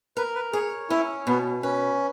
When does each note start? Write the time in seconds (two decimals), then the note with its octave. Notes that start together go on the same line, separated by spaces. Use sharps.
0.17 A#4 B4
0.35 B4
0.53 G#4 C#5
0.90 C#4 E4
1.27 B2 B3
1.63 C#4 B4